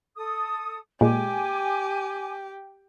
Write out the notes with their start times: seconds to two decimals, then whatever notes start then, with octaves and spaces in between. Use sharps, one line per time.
0.16 A4 D#6
1.01 A#2 G#3 G4 G#5 D6